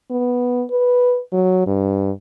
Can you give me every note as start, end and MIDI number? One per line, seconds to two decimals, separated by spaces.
0.10 0.65 59
0.71 1.20 71
1.33 1.62 54
1.67 2.11 43